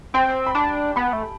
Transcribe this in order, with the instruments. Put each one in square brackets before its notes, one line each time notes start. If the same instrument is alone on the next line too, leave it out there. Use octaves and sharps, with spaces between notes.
[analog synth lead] C4 [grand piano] G5
[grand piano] B5
[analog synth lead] D4 [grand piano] A5
[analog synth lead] B3 [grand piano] B5
[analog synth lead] A3